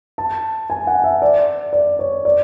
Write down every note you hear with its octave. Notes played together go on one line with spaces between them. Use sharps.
A5
G#5
F#5
E5
D5
D5
C#5
D5